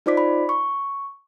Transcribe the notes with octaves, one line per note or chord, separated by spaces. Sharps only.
D#4 F4 C5 D5 D6 B6
B5
C#6